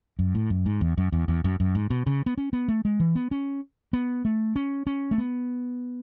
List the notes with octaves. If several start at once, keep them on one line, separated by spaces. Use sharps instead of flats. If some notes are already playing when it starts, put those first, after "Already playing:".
F#2
A2
F#2
G#2
E2
F#2
E2
E2
F#2
F#2
G#2
B2
C#3
B3
C#4
B3
A3
G#3
E3
B3
C#4
B3
A3
C#4
C#4
A3
B3